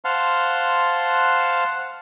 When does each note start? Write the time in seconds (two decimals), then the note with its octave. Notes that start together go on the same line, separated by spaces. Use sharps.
0.05 C5 F5 F#5 A5 C6